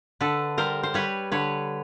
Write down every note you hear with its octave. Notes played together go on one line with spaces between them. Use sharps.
D3 A4 B4
G3 A#4 C5
C5
G3 B4 C#5
D3 B4 C#5